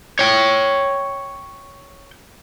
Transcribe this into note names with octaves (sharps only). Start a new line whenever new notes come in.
C#5 G5